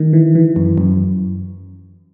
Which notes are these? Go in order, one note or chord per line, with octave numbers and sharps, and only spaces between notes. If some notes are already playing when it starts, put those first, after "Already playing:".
Already playing: D#3
E3
E3
F#2
F#2